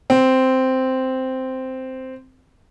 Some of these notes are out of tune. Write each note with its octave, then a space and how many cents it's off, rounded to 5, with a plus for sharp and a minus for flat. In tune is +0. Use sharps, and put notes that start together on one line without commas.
C4 -5